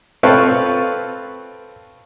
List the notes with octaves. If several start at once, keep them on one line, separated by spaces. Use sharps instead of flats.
C4 F4 A4 B4 C#5